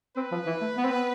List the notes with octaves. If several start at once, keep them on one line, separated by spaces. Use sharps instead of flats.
C4 B4
F3
E3
A3
B3
C4
B3